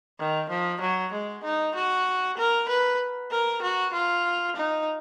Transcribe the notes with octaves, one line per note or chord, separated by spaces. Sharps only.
D#3
F3
F#3
G#3
D#4
F#4
A#4
B4
A#4
F#4
F4
D#4